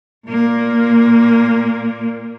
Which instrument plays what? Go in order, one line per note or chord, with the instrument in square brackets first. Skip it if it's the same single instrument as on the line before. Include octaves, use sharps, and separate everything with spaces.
[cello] A#2 A#3